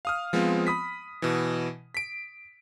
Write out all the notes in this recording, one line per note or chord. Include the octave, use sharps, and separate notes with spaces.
F5 D#6 F6
F3 G#3 B3 C4 F4
B5 D#6 B6
B2 E3
B6 D7